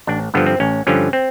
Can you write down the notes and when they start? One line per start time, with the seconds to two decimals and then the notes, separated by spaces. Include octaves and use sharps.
0.07 A1 D4
0.34 G2 D3 F3 B3
0.46 C4
0.60 A1 C#4
0.87 G2 D3 F3 C#4
1.13 C4